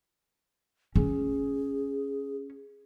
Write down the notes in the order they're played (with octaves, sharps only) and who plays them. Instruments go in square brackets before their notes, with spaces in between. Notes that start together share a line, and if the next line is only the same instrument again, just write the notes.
[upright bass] C#4 [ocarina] G#4